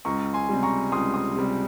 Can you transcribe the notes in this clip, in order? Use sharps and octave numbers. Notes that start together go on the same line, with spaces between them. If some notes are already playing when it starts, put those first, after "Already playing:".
C#2 A#5 C#6
G#5 C6
C3 G3
A#5 C#6
C#2 C6 D#6
C6 D#6
C3 G3